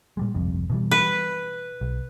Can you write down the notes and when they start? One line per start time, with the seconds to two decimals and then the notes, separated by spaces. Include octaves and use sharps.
0.17 A#2 G3 G#3
0.34 G1 C2 F2
0.70 B2 E3 G3
0.91 B4
1.81 B1